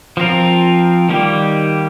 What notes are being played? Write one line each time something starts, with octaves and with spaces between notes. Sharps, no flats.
F3 C4 F4 A#4
D#3 G3 A#3 G4